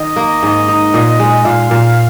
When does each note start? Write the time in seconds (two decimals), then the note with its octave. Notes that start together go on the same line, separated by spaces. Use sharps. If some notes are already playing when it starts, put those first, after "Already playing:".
Already playing: D#3 D#5
0.16 A#3
0.43 G#2
0.68 D#4
0.94 A#2
1.19 G#3
1.45 A#2 F5
1.71 A#2